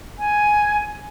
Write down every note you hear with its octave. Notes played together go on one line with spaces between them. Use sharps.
G#5